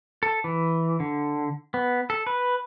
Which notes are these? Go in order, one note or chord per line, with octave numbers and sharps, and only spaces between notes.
A4
E3
D3
B3
A4
B4